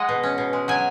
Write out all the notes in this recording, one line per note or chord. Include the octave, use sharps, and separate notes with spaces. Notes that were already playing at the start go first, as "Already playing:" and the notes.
Already playing: G#3 D#5 F#5
B2
C#4
B2
G#3
F#3 G#5